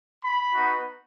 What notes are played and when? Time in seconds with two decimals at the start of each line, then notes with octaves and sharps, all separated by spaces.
0.23 B5
0.54 B3 D#4 F#4